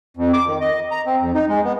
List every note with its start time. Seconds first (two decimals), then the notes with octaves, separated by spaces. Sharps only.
0.17 F2
0.33 D6
0.47 D#3
0.61 D#5
0.91 A#5
1.06 C4
1.21 F2
1.34 D#4
1.49 G#3
1.64 B3